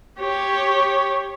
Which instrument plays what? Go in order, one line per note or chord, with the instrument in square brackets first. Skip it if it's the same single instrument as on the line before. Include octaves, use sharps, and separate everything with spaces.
[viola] G4 C#5